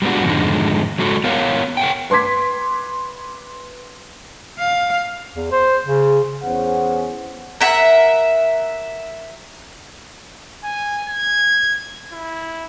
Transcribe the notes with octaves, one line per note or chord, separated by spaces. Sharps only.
G3 G#3 B3 D4 F#4
F2 G#2 D3 D#3 G#3
F#3 G#3 F#4 A4
B3 A#4 C#5 F5
A#4 F#5 G5
B4 C6 D6 G#6 B6
F5
E2
C5
C#3
E2 B3 C#4 G#4 C5 F#5
A#4 E5 F#5
G#5
G#6
E4